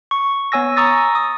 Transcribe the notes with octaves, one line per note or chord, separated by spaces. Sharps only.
C#6
B3 C#5 G#5 E6 A#6
A#5 C#6 D#6 E6 A6 A#6
D#6